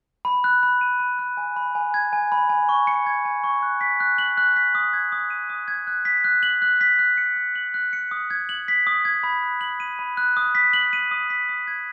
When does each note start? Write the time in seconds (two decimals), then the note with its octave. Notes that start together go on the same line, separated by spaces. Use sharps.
0.25 B5
0.44 F#6
0.63 B5
0.81 D#7
1.00 B5
1.19 F#6
1.37 G#5
1.56 B5
1.75 G#5
1.94 G#6
2.13 G#5
2.32 B5
2.49 G#5
2.69 C#6
2.87 C#7
3.07 G#6
3.25 G#5
3.44 C#6
3.63 F#6
3.81 B6
4.00 F#6
4.18 F#7
4.37 F#6
4.56 B6
4.75 D#6
4.93 G#6
5.12 D#6
5.30 D#7
5.50 D#6
5.68 G#6
5.87 F#6
6.05 B6
6.24 F#6
6.43 F#7
6.62 F#6
6.81 B6
6.99 F#6
7.17 C#7
7.37 F#6
7.55 F#7
7.74 F#6
7.93 C#7
8.11 D#6
8.30 G#6
8.49 F#7
8.68 B6
8.87 D#6
9.05 G#6
9.23 B5
9.43 F#6
9.61 F#7
9.80 D#7
9.99 B5
10.17 F#6
10.37 D#6
10.55 B6
10.73 F#7
10.93 D#7
11.11 D#6
11.30 B6
11.49 D#6
11.67 G#6